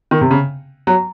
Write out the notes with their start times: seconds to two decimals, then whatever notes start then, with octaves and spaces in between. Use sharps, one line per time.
0.11 D#3
0.21 C3
0.31 C#3
0.87 F#3